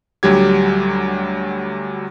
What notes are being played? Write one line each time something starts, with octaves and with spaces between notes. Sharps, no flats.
D2 F#3 G3 G4 G#6